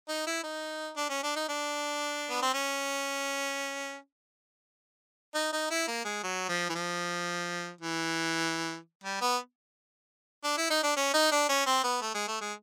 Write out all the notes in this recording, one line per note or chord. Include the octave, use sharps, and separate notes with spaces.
D#4
E4
D#4
D4
C#4
D4
D#4
D4
B3
C4
C#4
D#4
D#4
E4
A#3
G#3
F#3
F3
E3
F3
E3
G3
B3
D4
E4
D#4
D4
C#4
D#4
D4
C#4
C4
B3
A3
G#3
A3
G#3